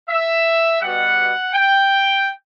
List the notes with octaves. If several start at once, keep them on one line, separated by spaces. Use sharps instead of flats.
E5
B2 G3 F#5
G5